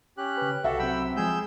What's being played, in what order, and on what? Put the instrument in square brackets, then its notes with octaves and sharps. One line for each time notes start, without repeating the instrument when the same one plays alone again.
[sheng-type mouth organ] C#4 G4 F#6
[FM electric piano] C#3 B4
[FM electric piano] C2 [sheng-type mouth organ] F#4 A4 [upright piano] E5 F#5 A5
[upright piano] F#3 C4 [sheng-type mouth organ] G5 B5 E6
[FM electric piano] F3 G#3 [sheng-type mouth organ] G#4 E6 G6